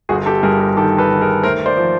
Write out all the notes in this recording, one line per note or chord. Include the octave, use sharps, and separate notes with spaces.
G1 F#4 G#4
G4 A4
G2 G#4 A#4
G#4 A#4
D#3 G4 A4
A4 B4
D#3
G#4 A#4
A3 A#4 C5
C5 D5
F3